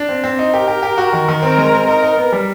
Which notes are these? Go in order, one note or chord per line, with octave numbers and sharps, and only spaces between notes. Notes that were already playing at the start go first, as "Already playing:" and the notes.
Already playing: D4
C4
C4
D#4
G4 A#4
G4
G4
F#4
D#3
D#3
C4 A#4
G#3
C4
D#4 A#4
D#4
B3
G3